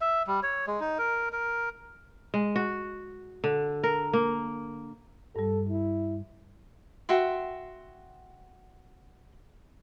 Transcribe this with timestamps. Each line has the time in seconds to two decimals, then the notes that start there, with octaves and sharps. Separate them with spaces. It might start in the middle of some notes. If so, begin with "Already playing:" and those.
0.01 E5
0.27 G3
0.43 C#5
0.67 G#3
0.80 D#4
0.98 A#4
1.33 A#4
2.34 G#3
2.56 F#4
3.44 D3
3.84 A#4
4.13 A#3
5.36 G2 G3 A4
5.69 E4
7.09 F#4 E5 G5 C6